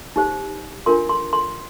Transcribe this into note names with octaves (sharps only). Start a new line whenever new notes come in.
D#4 G4 C5
D4 F4 A#4 C6
C6
C6